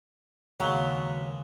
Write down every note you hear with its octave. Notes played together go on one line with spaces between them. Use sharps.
D#2 C#3 F#3 G#3 B3 B4 F5 G7